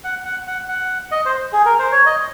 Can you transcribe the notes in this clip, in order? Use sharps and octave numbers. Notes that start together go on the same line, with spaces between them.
F#5
F#5
F#5
F#5
D#5
C5
G#4
A#4
C5
C#5
D#5